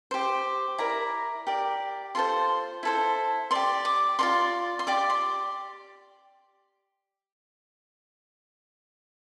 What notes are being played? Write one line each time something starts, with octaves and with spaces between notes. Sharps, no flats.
G4 C5
E4 A#4 D5 A#5
G4 A#4 D5
F4 A4 C5 C6
E4 A4 C5
G4 D5 C6
D6
F4 A#4 D5 C6
C6
G4 D5 D6
C6